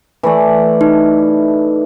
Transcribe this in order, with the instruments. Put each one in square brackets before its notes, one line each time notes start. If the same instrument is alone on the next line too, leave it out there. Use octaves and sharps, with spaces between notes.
[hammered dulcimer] E3 A3 D5
[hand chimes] D#4